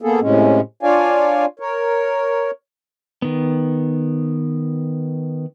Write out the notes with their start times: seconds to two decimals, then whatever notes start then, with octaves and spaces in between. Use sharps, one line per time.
0.02 A#3 B3 G#4 A4
0.21 A2 C3 G#3 C#4
0.83 D4 F4 C#5 D5 F5 G#5
1.60 A#4 C#5
3.22 D#3 B3